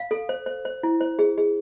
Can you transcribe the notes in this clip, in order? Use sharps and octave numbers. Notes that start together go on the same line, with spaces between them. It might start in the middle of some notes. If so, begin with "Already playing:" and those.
Already playing: F5
A4
C5
C5
C5
E4
C5
G#4
G#4